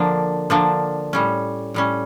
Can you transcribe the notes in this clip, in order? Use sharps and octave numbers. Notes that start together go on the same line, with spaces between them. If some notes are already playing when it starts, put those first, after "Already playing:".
Already playing: D3 F3 A#3 D4
D3 F3 A#3 D4
A2 G3 C#4
A2 G3 C#4